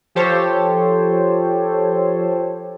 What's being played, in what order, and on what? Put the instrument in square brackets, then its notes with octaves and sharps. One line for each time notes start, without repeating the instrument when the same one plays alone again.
[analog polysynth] F3 G4 A4 C5 C#5